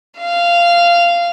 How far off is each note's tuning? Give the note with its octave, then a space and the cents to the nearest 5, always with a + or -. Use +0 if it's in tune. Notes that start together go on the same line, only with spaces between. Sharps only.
F5 -15